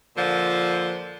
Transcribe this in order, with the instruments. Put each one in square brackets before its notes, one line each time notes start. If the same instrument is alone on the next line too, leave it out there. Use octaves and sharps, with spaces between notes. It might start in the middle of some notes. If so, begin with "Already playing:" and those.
[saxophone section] A#2 D3 F3